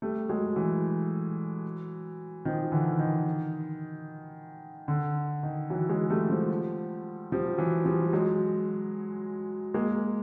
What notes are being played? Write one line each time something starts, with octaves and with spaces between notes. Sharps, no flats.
G3 A3
F#3 G#3
E3 F#3
D#3 F3
D3 E3
D#3
D3
D#3
E3 F#3
F#3 G#3
G3 A3
F3 G3
F3 G3
E3 F#3
F3 G3
G3
F#3 G#3
G#3 A#3